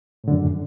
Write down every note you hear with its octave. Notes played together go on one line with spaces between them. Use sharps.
F#2 A2 D3